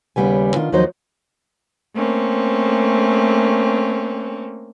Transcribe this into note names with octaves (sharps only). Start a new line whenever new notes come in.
D#2 C#3 G3 B3 G#5
D#3 D4 F4
D#2 F3 F#3 D#4 C5 D#5
A3 A#3 C4 C#4